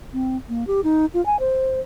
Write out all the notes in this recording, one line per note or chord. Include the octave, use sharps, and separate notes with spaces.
C4
A#3
G4
D#4
F4
G#5
C5